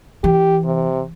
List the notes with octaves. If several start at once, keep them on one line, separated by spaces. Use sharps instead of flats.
E3 G4
C3